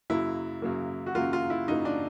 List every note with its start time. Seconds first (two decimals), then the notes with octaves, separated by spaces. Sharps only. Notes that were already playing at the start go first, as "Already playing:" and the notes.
0.10 F#2 C#3 F#3 A#3 E4
0.62 F#2 C#3 F#3 A#3
1.06 F#4
1.15 F#2 C#3 F#3 A#3 F4
1.33 F4
1.50 E4
1.68 F#2 C#3 F#3 A#3 D#4
1.85 D4